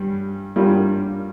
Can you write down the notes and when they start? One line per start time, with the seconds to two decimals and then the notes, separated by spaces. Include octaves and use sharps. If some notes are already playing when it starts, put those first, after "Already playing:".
Already playing: G2 G3
0.56 G2 G3 A#3 F4